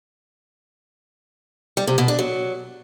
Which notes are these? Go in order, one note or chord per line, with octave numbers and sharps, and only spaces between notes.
G3
C3
B2
D4
F#3